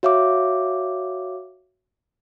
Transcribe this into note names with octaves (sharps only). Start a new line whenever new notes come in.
F#4 C#5 E5 F5 D6